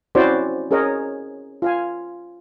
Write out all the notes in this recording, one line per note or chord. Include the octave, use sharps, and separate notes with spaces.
C4 C#4 E4 F#4 C5 D5
C#4 G#4 A#4 C#5 D#5
F4 F5 G#5